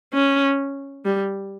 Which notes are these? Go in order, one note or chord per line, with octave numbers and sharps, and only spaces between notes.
C#4
G3